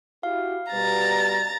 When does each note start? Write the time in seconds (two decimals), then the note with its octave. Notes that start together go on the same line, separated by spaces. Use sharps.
0.23 E4 F#4 G4 F5
0.73 B2 G3 B4 A#5 A6